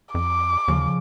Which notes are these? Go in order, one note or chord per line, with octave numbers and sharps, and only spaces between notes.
F2 D6
D#2 C#3 F3